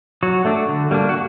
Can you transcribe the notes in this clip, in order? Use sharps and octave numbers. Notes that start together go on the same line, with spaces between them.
F#3 F#4
A3 D4
D3
G3 A#3 D4
F#4